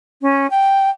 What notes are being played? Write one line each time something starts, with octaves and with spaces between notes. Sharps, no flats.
C#4
G5